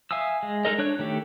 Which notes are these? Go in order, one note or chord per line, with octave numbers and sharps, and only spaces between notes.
E5 F5 G#5 D#6 E6
G#3
G#3 D#4 A4 A#4 D#5
D4 C#5 F#6
D#3 A3 G4